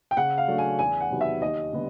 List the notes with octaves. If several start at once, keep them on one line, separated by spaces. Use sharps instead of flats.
G5
C#3 F#5
F5
F#3 A3 D4
G#5
E2 G#5
F#5
C3 D#3 F#3 B3
E5
D#2 D#5
D3 G3 B3 D#4